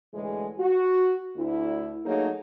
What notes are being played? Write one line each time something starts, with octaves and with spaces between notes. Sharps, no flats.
D2 A2 E3 G#3
F#4
D2 E4
F#3 A3 A#3 D#4 G#4 C#5